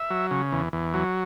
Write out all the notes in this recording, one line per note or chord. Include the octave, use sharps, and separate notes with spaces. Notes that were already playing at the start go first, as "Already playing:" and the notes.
Already playing: E5
F#3
C#3
E2
E2
F#3